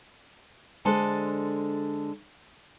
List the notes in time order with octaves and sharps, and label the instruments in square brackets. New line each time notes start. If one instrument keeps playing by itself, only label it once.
[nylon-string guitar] D3 G#3 D4 A4 C5